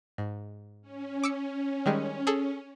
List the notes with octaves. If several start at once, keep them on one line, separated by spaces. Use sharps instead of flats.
G#2
C#4
D6 E6 C#7
D#3 G3 G#3
G#4 A4